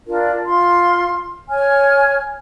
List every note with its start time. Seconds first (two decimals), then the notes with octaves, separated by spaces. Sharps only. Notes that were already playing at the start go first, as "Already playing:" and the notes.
0.07 D4 F4 A#4
0.44 F4 C6
1.50 C#5 G#5 F6